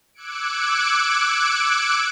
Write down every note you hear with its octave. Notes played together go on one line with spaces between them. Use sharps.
D6 E6 F#6 G#6 C#7 D7